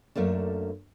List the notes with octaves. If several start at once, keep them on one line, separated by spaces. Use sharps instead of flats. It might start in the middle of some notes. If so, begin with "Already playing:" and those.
F#2 A3 A#3 D4